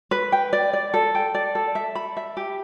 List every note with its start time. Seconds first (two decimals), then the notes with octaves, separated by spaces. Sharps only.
0.11 B4
0.32 G5
0.53 D5
0.73 D5
0.94 A4
1.15 G5
1.34 D5
1.55 A4
1.75 E5
1.95 B5
2.17 E5
2.37 G4